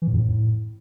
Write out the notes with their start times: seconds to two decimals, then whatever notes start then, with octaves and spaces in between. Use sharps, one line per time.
0.02 E3
0.07 A2
0.13 F2
0.19 A2